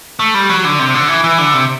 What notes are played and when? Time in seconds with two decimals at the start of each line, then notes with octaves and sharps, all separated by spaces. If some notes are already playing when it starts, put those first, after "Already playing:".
0.19 A3
0.34 G3
0.49 F#3
0.65 D3
0.79 C3
0.94 D3
1.08 E3
1.24 E3
1.38 D3
1.54 C3